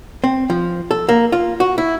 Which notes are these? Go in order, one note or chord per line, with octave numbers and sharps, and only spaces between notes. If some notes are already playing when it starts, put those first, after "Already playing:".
C4
F3
A4
A#3
F4
F#4
E4